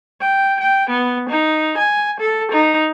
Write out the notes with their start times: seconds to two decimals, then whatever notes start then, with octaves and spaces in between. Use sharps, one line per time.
0.21 G5
0.60 G5
0.90 B3
1.29 D#4
1.78 G#5
2.20 A4
2.52 D#4